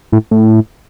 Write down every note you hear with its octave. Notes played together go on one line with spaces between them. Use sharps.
A2
A2